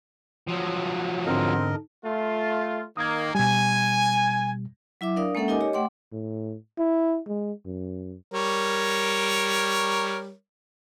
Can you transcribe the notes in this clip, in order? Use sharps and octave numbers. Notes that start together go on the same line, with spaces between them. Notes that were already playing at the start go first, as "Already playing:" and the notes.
F3 F#3
E2 G#2 D3 C4 D4 A#4 D#5
A3 F4
D#3 A#3 D#6 G#6
B2 G3 G#5
F#3 E4 E5 D6
D4 A#4 D5 F5 D#6
G#3 A#3 C#4 A4 E5 F#5
D#4 G4 A#4 D#5 G#5 D6
G4 C#5 D#5
A3 F#5 G5 C6 D6
A2
E4
G#3
F#2
G3 A#4 C#5